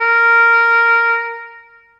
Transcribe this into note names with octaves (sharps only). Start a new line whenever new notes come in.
A#4